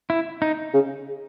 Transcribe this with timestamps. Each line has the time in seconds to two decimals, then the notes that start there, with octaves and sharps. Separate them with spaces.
0.10 E4
0.42 D#4
0.74 C#3